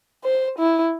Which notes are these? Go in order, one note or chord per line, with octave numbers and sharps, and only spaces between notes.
C5
E4